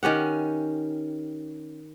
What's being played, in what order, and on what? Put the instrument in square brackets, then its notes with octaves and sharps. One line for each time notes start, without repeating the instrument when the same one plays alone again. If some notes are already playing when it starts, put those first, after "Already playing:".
[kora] D#3 C#4 G4 F#5